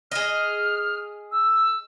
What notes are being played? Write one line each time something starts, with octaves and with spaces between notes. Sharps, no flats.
G#4 D#5 F6
E6